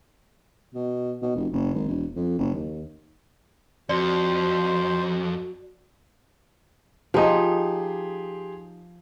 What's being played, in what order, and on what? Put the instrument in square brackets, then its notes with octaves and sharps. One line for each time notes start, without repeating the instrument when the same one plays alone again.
[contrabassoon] B2
B2
F1
F#1
G#1
E1
F2
F#1
D#2
[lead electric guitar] F2 [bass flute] F#4 [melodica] C5 [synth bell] D5
[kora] F3 D#4 [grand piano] G4 G#4 C6